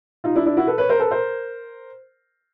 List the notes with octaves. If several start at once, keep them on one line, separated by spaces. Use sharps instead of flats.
D#4 F4
D4 E4
D4 E4
E4 F#4
A4 B4
B4 C#5
A#4 C5
A4 B4
A#4 C5